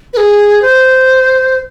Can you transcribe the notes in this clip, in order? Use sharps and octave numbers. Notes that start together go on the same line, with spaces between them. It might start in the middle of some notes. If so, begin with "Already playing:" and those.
B4
G#4
C5